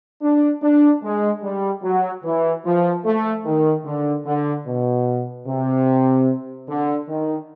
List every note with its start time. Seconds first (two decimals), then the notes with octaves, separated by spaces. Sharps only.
0.22 D4
0.62 D4
1.03 G#3
1.43 G3
1.83 F#3
2.24 E3
2.65 F3
3.04 A3
3.45 D#3
3.85 D3
4.26 D3
4.67 B2
5.47 C3
6.68 D3
7.08 D#3